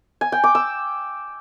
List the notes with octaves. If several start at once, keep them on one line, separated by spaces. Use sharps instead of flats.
G#5
G5
D6
E6